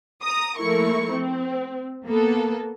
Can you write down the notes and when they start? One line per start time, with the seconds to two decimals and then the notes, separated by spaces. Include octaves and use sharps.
0.22 A#5 D#6
0.57 F3 A3 A#3 E4 A#4 C#6
1.11 C4
2.06 A#3 B3 A4